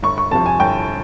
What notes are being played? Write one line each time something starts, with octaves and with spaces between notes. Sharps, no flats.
G1 C#6
C#6
F2 C3 F3 A5
G#5
G1 G5